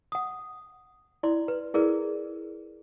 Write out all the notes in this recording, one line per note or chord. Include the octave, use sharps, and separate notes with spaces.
F#5 D#6
E4 D5 C6
B4
E4 G#4 A#4 B4 D5